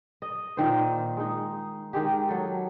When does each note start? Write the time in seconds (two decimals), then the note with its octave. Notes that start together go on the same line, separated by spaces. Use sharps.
0.22 D#5
0.57 A#2 D#3 C5
1.17 G#3 D#4
1.93 D#3 G#3 G4
2.28 F#3 A4